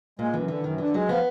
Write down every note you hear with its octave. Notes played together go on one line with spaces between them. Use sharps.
A#2 G#3
F#2 E3
D3 E3
F#2 D#3
D3 E3
F#3 G#3
F3 B3